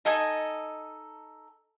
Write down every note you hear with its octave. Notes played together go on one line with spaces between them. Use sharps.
D#4 A4 D#5 G#5